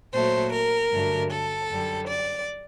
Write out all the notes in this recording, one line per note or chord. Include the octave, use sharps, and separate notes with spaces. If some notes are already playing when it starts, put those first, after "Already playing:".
A#2 F#3 A3 C5
A#4
G2 D3 F#3 A3
A4
F#2 D3 G3
D5